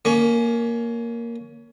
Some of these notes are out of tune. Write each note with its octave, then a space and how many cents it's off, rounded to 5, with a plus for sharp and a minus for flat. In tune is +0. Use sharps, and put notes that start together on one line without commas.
A#3 +0 C#4 +20